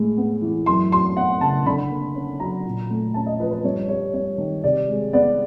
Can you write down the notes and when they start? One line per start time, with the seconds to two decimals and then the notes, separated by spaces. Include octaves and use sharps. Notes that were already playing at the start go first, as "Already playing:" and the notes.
Already playing: A2 G#3
0.17 B3
0.42 E3
0.66 F#2 C6
0.92 F#3 C6
1.16 B3 F#5
1.41 C#3 A5
1.66 D3 B5
1.90 A#3
2.15 C#4
2.40 F#3 A#5
2.65 A#2
2.90 A3
3.14 C#4 A5
3.26 D#5
3.39 F3 B4
3.51 B4
3.64 G2 C#5
3.88 G3 C#5
4.14 G2 C#5
4.38 D#3
4.64 C3 D5
4.89 G#3
5.13 B3 D5